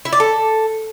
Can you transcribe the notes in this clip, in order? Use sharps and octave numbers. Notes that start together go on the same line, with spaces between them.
E4
D5
A4